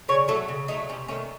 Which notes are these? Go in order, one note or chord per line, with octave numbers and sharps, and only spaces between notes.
C#3 C#5
F#3 A3 A4
C#3
F#3 A3 D#4
C3 C#4
D#3 A3 C#4